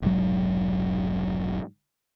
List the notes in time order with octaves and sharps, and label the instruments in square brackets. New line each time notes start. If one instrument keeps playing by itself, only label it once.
[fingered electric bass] F1 B1 G#2 F#3